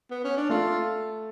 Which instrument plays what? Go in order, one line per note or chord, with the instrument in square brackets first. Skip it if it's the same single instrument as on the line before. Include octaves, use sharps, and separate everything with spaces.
[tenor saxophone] B3
C#4
D4
[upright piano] A3 A4 [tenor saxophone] F4